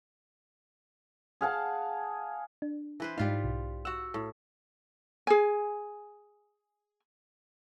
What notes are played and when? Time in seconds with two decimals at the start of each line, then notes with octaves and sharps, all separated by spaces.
1.41 G#4 F5 F#5 A5
2.62 D4
3.00 E3 B4 C5
3.18 G#2 G3 D#4 F4 F5
3.44 B1
3.85 F#4 F#5 E6
4.14 A2
5.27 G#4 G#5